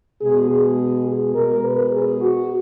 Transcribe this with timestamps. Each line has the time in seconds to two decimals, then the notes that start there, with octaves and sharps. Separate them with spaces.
0.21 B2 G#3 G#4
0.51 G#4
1.08 G#4
1.35 B2 G#3 A#4
1.65 B4
1.92 G#4
2.21 F#4